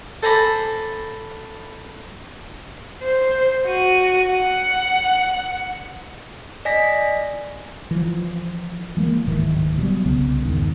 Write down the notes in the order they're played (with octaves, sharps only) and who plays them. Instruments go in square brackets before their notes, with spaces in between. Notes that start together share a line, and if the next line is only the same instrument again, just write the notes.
[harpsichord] A4 C5 G#5 A#5 B5 D6
[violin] C5
F#4 D#7
F#5
[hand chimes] D5 D#5 G#5 A#6 B6
[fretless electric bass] E3 F3
E3 G#3 A#3
D1 G#2 D#3 E3
B2 F#3 G3
C2 C#3 B3
E2 G#2 D#3